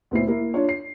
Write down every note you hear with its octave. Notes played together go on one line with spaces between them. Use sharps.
D2 A#2 B3 E4 C5 C7
A#3 E4 A#4
D4 F4 C#5
C7